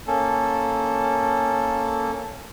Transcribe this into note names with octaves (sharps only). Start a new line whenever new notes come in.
A#3 C#4 A4